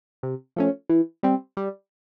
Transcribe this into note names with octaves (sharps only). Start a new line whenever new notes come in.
C3
F3 A3 C#4
E3
G3 C4
G3